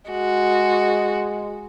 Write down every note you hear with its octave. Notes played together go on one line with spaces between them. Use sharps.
G#3 F#4